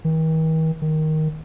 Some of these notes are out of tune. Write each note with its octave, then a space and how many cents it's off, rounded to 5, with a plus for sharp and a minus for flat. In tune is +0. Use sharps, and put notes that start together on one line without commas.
D#3 +45
D#3 +5